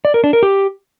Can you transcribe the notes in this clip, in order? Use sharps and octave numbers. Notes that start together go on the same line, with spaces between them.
D5
A#4
D4
A#4
G4